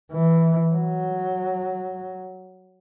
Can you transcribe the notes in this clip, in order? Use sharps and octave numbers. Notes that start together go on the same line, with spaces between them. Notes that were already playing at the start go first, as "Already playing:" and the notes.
E3
F#3